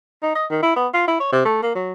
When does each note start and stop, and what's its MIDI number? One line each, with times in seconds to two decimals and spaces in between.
0.22 0.33 63
0.35 0.45 75
0.51 0.59 51
0.62 0.74 64
0.76 0.87 59
0.94 1.07 65
1.07 1.18 64
1.20 1.31 73
1.32 1.43 48
1.45 1.60 57
1.62 1.75 58
1.75 1.93 54